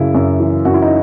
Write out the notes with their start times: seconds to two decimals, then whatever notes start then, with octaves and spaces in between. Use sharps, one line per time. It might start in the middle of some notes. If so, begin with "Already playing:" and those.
Already playing: F#2 C#3 E4
0.15 F#2
0.40 E3
0.65 F#2 F#4
0.74 E4
0.82 D#4